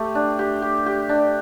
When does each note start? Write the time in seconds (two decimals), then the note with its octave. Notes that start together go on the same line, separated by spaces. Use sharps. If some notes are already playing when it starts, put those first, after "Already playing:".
Already playing: A3 G4
0.15 D4
0.39 G4
0.62 G4
0.86 G4
1.09 D4